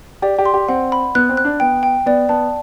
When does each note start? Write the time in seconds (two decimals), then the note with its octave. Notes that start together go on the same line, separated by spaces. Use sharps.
0.22 G4 D5
0.39 G4
0.46 C6
0.54 G4
0.69 C4 F#5
0.92 B5
1.15 B3 F#6
1.29 C4
1.37 F#6
1.45 D4
1.60 B3 G5
1.83 G5
2.06 B3 D5
2.29 B3 A5